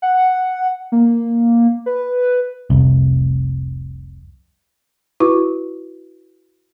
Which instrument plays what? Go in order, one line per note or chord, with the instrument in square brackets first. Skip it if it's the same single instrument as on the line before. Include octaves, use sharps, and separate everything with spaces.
[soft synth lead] F#5
A#3
B4
[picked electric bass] F1 C2
[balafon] E4 F#4 B4 C#6